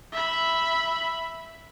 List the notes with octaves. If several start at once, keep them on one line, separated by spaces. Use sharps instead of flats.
E5 B5